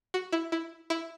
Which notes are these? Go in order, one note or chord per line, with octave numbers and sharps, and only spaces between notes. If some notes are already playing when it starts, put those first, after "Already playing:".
F#4
E4
E4
E4